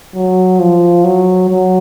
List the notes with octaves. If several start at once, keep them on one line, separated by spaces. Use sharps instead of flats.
F#3
F3
F#3
F#3